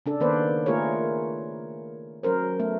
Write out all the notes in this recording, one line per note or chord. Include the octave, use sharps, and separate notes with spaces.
C#3 D4 A4
D#3 A#3 B3 B4 C5 D5
A3 A#3 F4 G#4 A#4 C#5
F#3 C#4 A#4 C5
A3 B3